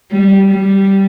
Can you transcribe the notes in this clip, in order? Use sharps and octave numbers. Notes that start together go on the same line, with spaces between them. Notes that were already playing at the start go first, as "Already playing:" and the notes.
G3
G3